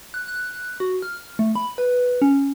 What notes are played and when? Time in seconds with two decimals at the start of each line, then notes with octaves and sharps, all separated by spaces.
0.14 F#6
0.28 F#6
0.80 F#4
1.02 F6
1.39 A3
1.55 B5
1.78 B4
2.22 C#4